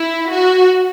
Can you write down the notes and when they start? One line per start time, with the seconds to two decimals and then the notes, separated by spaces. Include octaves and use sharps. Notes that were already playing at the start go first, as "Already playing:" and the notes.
Already playing: E4
0.30 F#4